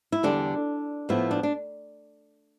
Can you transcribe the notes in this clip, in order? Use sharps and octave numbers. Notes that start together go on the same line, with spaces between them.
E4
E2 D3 G3 D4
A2 F3 B3 E4
D4
D4